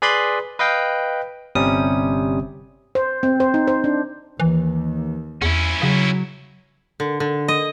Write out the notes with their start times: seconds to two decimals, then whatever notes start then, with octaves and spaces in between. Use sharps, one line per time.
0.02 G#4 B4 D5 B5 C6
0.59 B4 D#5 F5 G5
1.55 G1 C3 G3 C#4 D#6
2.95 C5
3.23 C4
3.40 C5
3.54 D#4
3.68 C5
3.84 D4
4.40 D#2 E3
5.42 E2 C#4 E4
5.82 C#3 F#3
7.00 D3
7.20 D3
7.48 D#5